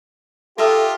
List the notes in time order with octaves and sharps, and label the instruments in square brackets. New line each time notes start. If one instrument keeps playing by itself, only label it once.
[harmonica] F4 G4 [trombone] A4 [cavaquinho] A#4 E5 D#6